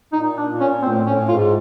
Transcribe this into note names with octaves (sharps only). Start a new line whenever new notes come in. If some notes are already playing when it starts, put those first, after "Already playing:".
A#2 D#4
D4
A#2
C#4
A2 C4
A2 C#4
G#2 F4